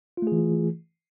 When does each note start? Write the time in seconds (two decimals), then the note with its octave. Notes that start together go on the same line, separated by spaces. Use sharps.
0.17 F4
0.22 A3
0.27 G#4
0.32 E3